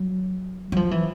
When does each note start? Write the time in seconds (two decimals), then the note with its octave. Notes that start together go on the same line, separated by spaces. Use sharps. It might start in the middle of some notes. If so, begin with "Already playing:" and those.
Already playing: F#3
0.72 F#3
0.76 F3
0.91 E3